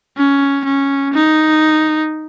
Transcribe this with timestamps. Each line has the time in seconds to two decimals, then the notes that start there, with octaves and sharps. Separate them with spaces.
0.18 C#4
0.65 C#4
1.13 D#4